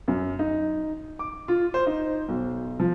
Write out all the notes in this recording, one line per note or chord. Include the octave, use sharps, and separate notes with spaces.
F#2
D#4
D6
F4
C5
D#4
B1
F3